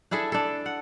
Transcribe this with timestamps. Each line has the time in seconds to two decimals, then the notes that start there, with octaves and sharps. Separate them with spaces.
0.11 D4 E4 G#4 A4
0.32 D4 A4
0.66 F#5